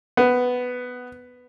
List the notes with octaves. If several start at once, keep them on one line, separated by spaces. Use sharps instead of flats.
B3